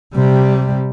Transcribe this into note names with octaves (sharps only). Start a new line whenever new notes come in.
C3 G3